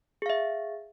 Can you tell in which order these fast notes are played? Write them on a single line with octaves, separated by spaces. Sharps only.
G#4 F5 E5